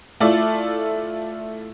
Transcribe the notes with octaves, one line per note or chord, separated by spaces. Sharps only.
A3 E4 F4 A4 D5